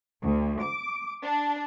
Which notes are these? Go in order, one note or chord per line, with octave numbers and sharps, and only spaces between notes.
D2
D6
D4